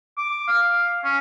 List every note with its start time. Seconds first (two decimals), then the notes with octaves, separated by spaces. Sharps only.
0.18 D6
0.48 F5
1.04 C#4